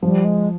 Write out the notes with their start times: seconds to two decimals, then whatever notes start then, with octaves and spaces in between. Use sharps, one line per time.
0.02 F3 G3
0.25 G#3